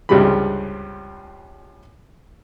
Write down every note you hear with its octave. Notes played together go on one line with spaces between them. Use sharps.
C#2 G2 C3 G3 G#3 B5